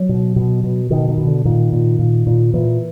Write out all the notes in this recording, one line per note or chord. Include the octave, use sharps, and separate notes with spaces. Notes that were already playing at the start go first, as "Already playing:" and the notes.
Already playing: F#3
B2
B2
B2
B2 D#3
D#3
B2
D3
A#2 D#3
A#2
A#2
A#2
A#2 E3